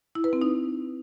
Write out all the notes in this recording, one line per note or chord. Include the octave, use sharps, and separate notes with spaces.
E4
B4
C4
D#4